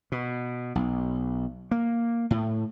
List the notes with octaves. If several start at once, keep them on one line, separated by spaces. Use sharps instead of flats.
B2
B1
A#3
A2